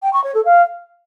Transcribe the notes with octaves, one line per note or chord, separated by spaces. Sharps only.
G5
C#6
C#5
A4
F5